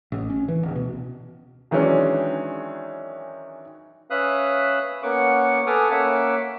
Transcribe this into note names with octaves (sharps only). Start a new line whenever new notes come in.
A1
C#4
E3
D1
B2
D#3 E3 F#3 G#3 C#4 D4
C#4 B4 E5 F5 D#6 F#6
A#3 B3 C#4 F#5 C#6 D6
A4 B4 G#5 D6 D#6 F6
A#3 C#4 E5 F#5 D6